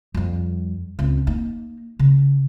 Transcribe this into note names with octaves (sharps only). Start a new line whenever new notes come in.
F2 G3
C#2 C4
A#3 D#4
C#3